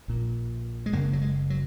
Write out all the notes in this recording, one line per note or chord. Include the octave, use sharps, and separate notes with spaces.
A#1 A#2
G#3
F#1 F#2 C#3 A#3
F#3
G#3
F#3